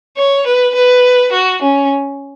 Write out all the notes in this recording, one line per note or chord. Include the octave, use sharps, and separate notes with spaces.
C#5
B4
B4
F#4
C#4